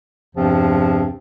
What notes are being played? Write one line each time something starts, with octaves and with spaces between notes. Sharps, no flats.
E2 G2 C3 F3 C4